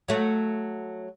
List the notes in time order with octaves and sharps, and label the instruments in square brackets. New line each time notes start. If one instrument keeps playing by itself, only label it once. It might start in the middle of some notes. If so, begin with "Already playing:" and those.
[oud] F#3 A3